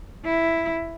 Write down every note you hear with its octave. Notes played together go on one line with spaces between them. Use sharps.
E4